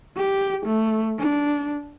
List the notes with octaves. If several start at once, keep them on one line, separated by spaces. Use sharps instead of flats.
G4
A3
D4